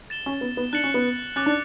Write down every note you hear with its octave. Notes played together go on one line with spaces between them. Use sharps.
A6 E7 G7
C#4
B3
B3
D4 F#6 A6 C#7 F#7
C#4
B3
C#4 D6 F#6 A6
D4